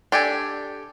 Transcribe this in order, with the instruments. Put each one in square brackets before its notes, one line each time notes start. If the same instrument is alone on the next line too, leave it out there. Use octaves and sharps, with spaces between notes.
[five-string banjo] D4 G4 A4 G5 G#5